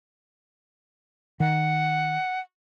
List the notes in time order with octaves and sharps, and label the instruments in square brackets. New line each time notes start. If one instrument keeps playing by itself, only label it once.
[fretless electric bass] D#3 [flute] F#5